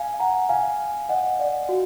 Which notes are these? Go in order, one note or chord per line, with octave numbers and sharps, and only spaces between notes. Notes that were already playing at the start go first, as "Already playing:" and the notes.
Already playing: F5 G#5
F#5 A#5
F5 G#5
D#5 F#5
D5 F5
F#4